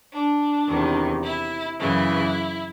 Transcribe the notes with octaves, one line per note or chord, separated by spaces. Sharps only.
D4
E2 C3 D#3
E4
F#2 C#3 E3 E4